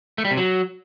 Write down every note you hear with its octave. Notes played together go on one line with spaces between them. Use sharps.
A3
G3
C3
F#3